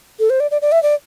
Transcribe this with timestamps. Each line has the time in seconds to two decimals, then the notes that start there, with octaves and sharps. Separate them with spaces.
0.20 A4
0.30 C5
0.40 D5
0.51 D5
0.62 D5
0.72 E5
0.83 D5